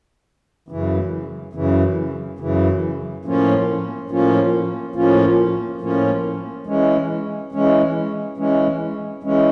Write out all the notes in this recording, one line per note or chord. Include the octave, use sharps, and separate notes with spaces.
F#2 C#3 E3
F#2 C#3 E3
F#2 C#3 E3
A2 F3 A#3 C#4 F4
A2 F3 A#3 C#4 F4
A2 F3 A#3 C#4 F4
A2 F3 A#3 C#4 F4
E3 G#3 C#4
E3 G#3 C#4
E3 G#3 C#4
E3 G#3 C#4